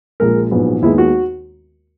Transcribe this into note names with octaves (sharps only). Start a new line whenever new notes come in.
A#1 A#2 G#3 A#4
A#1 G#2 F#3 B3
D#2 D#3 G#3 B3 E4
F#4